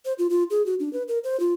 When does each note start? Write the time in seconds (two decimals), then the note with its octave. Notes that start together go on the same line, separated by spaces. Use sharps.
0.05 C5
0.19 F4
0.30 F4
0.50 G#4
0.66 F#4
0.80 D4
0.93 B4
1.08 A#4
1.24 C5
1.40 F4